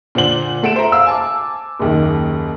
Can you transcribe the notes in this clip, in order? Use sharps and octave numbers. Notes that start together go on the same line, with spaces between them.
A#2 D3 C5 F#5 F#7 G7
A3 A4 F#5 D7 E7
C5 E5 A#5
F5 E6
G#5 A5 D6
F#1 D#2 D#3